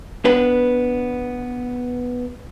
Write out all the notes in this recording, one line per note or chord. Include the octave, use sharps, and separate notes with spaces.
B3 D4 B4